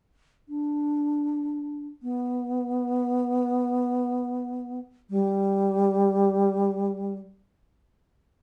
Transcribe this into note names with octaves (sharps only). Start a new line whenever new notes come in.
D4
B3
G3